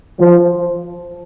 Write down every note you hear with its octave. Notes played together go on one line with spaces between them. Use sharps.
F3